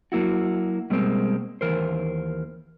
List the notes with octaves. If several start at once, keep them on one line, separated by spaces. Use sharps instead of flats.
F#3 A#3 E4 F#4
B2 G3 G#3 A#3 C4
D#2 E3 A#4 C5